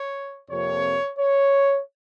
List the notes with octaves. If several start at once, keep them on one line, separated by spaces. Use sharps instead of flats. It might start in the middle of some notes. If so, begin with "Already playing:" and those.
Already playing: C#5
F2 C3 F3 A#3 C#5
C#5